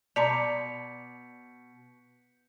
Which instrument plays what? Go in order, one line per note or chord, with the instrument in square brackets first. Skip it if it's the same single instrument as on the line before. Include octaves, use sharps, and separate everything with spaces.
[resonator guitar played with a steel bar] B2 [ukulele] D5 [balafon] A5 A#5 C6 [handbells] G6 B6 C#7